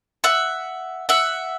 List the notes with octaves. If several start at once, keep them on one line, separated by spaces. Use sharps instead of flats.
E5 F#5
E5 F#5